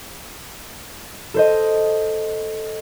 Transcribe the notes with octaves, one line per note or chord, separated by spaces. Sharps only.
A4 C5 D#5